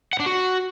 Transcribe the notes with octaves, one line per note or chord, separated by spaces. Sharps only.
F#5
D4
F#4